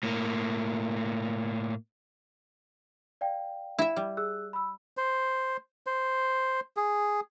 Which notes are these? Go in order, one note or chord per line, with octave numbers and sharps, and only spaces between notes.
A2 A#3
D5 F5 G5
E4 E5
G3
G#4 E6 F#6
B5 E6
C5
C5
G#4